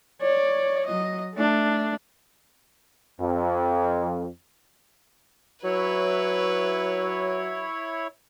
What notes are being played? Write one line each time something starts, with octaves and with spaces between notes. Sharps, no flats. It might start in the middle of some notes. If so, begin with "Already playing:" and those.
C#5 D5
F#3 D#5
A3 D4
F2
F#3 E4 B4 C#5